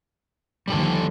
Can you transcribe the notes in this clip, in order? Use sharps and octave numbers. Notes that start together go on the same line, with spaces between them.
D#2 D3 F3 G3 G4 A4